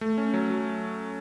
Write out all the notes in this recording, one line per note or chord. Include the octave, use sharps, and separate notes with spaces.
A3
C#4
F#3
F#3